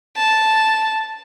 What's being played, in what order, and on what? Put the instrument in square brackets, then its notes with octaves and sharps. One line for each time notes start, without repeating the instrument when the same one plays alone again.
[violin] A5